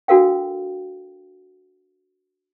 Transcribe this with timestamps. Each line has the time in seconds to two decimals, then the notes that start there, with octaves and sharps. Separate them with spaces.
0.08 D4 F#4 A4 A#4 F5 G5